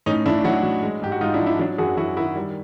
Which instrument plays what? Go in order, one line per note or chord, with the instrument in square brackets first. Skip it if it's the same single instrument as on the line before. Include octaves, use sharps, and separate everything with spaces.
[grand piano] A2 C#4 D#4
A2 D4 E4
F#3 E4 F#4
F#3
G#3
G#2 G4
F#4
G#2 D#4 F4
D4 E4
F3
D4 E4
F#3 D4
F#2 F#4 G#4
F#2 E4 F#4
D#3 E4 F#4
G3